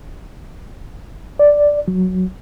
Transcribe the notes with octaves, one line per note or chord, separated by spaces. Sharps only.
D5
F#3